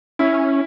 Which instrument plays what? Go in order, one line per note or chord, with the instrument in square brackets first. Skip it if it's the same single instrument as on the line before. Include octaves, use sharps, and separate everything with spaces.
[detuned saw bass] C#4 [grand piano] E4